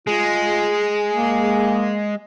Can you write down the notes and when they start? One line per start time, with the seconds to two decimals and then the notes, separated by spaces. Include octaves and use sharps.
0.08 G#3 F4 G#4
1.11 A#3